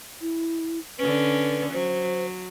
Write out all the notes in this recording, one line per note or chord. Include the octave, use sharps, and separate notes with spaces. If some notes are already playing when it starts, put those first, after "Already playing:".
E4
D3 C#4 B4
F#3 C5